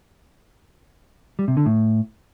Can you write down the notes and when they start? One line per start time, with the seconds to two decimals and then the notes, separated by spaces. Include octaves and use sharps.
1.39 G3
1.48 C3
1.57 D3
1.66 A2